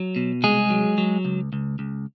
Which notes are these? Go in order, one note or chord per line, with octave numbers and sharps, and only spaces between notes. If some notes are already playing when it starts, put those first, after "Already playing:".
Already playing: F#3
B2
C2 G#3 G#4
F#3
F#3
C#2
C#2
C#2